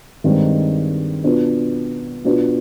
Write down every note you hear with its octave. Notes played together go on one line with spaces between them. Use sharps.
G2 D#3 G#3 C4 D#4
B2 B3 D4 F4
B2 B3 D4 F4